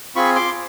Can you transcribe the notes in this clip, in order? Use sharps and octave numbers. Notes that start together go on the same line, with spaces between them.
C4 F4 G#4 B5 C#6
C6 D6